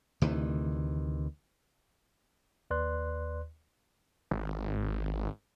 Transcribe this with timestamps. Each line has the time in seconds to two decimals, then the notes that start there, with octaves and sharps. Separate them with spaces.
0.22 D2 C3 D#3 E3
2.70 D#2 B4 D5 C6 F#6
4.31 G#1